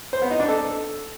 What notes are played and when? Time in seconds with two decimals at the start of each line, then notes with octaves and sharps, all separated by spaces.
0.13 C5
0.22 B3
0.31 D#4
0.40 D4
0.49 A4